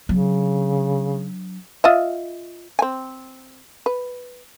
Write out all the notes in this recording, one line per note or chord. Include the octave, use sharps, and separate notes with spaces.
C#3 F#3 D4
F4 D#5 E5
C4 G#5
B4